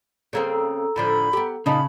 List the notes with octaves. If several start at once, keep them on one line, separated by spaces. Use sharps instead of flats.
C#3 A#3 C4 A4 A#5 E6
A2 D3 F3 B5
B3 G4
A#2 C#3 D#4 A5 B5